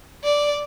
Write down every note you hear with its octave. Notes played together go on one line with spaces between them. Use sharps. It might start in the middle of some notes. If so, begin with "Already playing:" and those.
D5